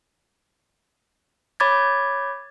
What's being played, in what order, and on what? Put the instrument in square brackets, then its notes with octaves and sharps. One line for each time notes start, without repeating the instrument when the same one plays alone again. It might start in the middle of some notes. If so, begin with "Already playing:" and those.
[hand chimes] C#5 B5 D6 G#6 A6